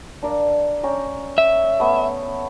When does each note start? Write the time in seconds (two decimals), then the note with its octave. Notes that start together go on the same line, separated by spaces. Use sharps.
0.23 D4 A#4 F5
0.83 C#4 G5 A#5
1.38 E5
1.80 A3 B3 G#5